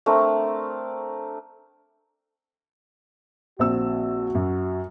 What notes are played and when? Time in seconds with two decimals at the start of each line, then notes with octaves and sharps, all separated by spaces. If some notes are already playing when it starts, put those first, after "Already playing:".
0.06 A3 C4 D4 A#4
3.59 A#1 C4 F#4 E6
4.35 F#2